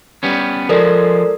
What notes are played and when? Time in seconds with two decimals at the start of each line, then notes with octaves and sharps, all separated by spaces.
0.23 G3 B3 C#4
0.69 F3 G#3 A4 A#4 D5